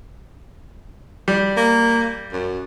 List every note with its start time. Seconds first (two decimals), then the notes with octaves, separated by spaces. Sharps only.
1.28 G3
1.57 A#3
2.33 F#2